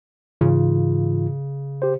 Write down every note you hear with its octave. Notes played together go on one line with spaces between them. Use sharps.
G#2 C#3 E3 F4
G4 C5